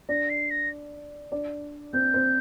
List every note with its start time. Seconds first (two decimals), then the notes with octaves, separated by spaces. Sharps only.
0.09 D4 D5 A#6
0.29 C7
0.50 A#6
1.32 D4 D5
1.93 C4 C5 G6
2.14 C4 C5